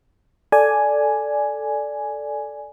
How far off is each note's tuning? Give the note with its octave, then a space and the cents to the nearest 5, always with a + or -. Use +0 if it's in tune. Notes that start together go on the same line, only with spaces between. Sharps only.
A4 +0 D5 +0 G#5 +5